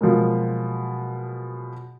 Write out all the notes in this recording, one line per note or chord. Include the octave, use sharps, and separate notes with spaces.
B2 F3 F#3 G#3 A#3